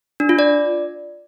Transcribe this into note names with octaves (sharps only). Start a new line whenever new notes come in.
D4
F4
D5